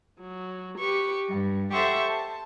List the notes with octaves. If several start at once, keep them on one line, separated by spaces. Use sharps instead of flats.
F#3
G4 B4 C#6
G2
G4 A4 C5 E5 F#5 C#6
A5